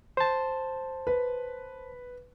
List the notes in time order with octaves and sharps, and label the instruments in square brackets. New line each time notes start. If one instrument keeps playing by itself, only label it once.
[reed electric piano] C5 A5
[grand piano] B4